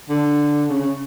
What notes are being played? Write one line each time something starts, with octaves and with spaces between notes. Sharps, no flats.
D3
C#3
C#3